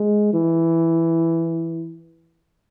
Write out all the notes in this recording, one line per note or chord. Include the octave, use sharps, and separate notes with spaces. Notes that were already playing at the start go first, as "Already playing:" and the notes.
Already playing: G#3
E3